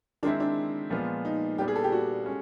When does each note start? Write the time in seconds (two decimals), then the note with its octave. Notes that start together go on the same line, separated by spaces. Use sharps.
0.23 D#3 G#3 C4 D4 E4
0.40 D4
0.90 A#2 F3 G#3 B3
1.25 D#4
1.58 A#2 G3 B3 D4 G4
1.68 G#4
1.75 A4
1.84 G4
1.92 F#4
2.26 G#3 C#4